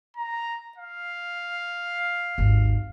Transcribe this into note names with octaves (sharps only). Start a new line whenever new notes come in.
A#5
F5
G#1 D#2